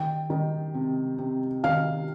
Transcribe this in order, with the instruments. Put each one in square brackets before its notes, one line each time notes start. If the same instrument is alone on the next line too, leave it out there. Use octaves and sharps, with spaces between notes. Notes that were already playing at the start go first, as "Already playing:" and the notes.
Already playing: [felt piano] D#3 G5
D#3
C3
C3
D#3 F5